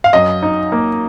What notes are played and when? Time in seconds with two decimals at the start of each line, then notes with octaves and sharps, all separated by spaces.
0.04 F5
0.13 F#2 D#5
0.43 D#4
0.72 A#3